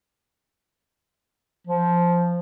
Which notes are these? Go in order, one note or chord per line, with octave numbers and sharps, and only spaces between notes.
F3